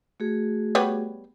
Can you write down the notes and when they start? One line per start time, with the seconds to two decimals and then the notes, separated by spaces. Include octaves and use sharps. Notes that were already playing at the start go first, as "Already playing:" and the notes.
0.20 A3 F#4 G#4
0.75 G3 B3 C#5